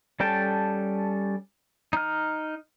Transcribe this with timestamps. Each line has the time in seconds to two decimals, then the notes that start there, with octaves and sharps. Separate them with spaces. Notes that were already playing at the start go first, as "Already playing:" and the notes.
0.20 G3 C#4 A4 G5 A5
1.93 D#4 F6